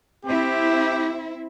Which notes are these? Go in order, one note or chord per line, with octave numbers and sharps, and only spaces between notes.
C4 E4 G4